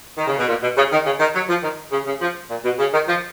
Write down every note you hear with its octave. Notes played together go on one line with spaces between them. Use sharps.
D#3
C#3
B2
A#2
B2
C#3
D#3
C#3
D#3
F#3
F3
D#3
C#3
C#3
F3
A#2
B2
C#3
D#3
F3